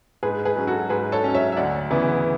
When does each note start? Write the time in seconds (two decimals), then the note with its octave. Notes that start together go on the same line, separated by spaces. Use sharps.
0.23 G#2 G#4 B4
0.45 G#4 B4
0.56 F#3 C#4
0.67 F#4 A4
0.90 G#2 G#4 B4
1.12 A4 C#5
1.24 F#3 C#4
1.35 C#5 E5
1.52 E5
1.57 D2 D5 F#5
1.90 C#3 E3 B3 E4